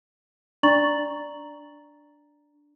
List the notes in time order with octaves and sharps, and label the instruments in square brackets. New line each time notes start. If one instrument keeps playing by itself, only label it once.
[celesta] D4 D5 A#5 C#6 A6 F#7